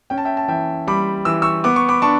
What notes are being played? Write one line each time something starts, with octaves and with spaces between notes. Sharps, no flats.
C#4 G5
A5
E5 G5
A5
E3 E5 G5
G3 B5 D6
E3 E6
C#6 E6
B3 D6
C#6
B5 D6
D4 A5 C#6